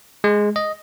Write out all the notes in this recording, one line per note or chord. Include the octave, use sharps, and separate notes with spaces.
G#3
D#5